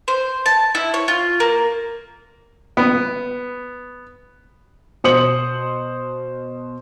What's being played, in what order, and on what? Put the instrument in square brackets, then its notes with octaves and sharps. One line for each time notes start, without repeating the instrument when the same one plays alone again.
[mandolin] C5
A5
E4
C#5
F4
A#3
[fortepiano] B3
[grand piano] B2 C5 D#6 C#7 F#7